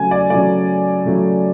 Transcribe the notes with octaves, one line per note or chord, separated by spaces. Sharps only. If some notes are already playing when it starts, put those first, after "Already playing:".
Already playing: C#3 F#3 A3 G#5
D5
C#3 F#3 A3 D5
C#3 F#3 A3